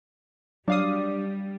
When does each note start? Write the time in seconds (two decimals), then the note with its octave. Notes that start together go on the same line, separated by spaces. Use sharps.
0.68 F#3 G3 D4 F5 D#6